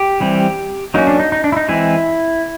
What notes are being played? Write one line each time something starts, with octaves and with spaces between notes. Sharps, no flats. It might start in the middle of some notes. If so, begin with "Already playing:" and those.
Already playing: G4
E3 G3 C4
F#3 A#3 C#4 D#4
D4
D#4
D#4
D4
E4
D#4
E3 G#3 C4 E4